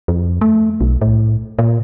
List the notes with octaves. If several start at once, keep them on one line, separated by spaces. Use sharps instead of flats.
F2
A3
B1
A2
A#2